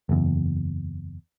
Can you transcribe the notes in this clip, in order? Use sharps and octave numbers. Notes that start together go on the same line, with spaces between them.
F#1 E2